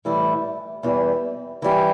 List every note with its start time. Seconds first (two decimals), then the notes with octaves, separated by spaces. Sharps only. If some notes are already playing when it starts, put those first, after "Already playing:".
0.05 A2 E3 G3 E4
0.83 E2 E3 G3
1.62 E3 G3 E4 G4